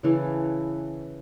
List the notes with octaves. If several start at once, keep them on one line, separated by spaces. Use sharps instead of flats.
C#3 E3 A4